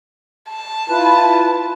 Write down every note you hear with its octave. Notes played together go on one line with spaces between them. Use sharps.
A5
E4 F4 B4